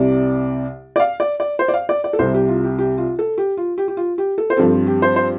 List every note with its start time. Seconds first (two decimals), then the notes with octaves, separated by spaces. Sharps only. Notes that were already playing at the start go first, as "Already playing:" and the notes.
Already playing: C2 C3 G3 D5
0.96 D5
1.00 F5
1.20 D5
1.40 D5
1.59 C5
1.68 D5
1.74 F5
1.89 D5
2.04 D5
2.13 A4
2.19 C2 C3 G3 C5
2.34 G4
2.48 F4
2.64 G4
2.79 G4
2.98 F4
3.19 A4
3.38 G4
3.57 F4
3.78 G4
3.88 G4
3.97 F4
4.18 G4
4.38 A4
4.50 C5
4.57 G2 F3 C4 A4
4.72 F4
4.87 G4
5.02 C5
5.16 C5